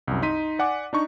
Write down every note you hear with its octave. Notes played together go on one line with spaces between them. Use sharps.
C2 F#2
D#4 C6 B6 D#7
D5 F#5 G#5 D6
D4 D#4 C#6